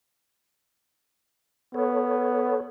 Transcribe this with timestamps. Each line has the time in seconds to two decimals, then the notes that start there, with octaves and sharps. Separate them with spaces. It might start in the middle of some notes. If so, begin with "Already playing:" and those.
1.74 B3 A4 C#5